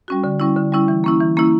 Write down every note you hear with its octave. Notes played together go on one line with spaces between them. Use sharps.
G3 C#4 F#4
D3
G3 C#4 E4
D3
G3 C#4 E4
E3
A#3 C#4 E4
E3
A#3 C#4 E4